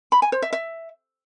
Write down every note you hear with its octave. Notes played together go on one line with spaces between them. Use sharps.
B5
G#5
C5
E5
E5